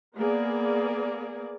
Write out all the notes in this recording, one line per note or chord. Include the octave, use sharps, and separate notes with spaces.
A#3 B3 G#4 D5